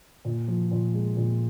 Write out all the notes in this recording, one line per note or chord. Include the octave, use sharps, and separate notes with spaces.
A#2
F3
A#2
G#3
A#2